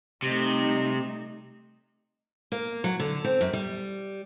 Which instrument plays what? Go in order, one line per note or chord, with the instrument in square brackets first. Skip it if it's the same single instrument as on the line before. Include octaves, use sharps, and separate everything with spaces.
[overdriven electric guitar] C3 [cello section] G3 A3 D#4
[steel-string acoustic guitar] A#3
F#3
D3
C4
F#2
G3